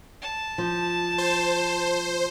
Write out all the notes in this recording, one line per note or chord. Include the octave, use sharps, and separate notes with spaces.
A5
F3
C5